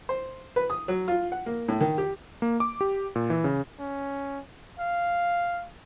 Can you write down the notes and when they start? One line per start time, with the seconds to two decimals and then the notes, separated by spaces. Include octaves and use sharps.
0.09 C5
0.56 B4
0.70 D#6
0.88 F#3
1.08 F4
1.32 F#5
1.46 A#3
1.68 A2
1.81 D#3
1.98 G4
2.42 A#3
2.60 D6
2.81 G4
3.16 A#2
3.30 E3
3.44 C#3
3.79 C#4
4.79 F5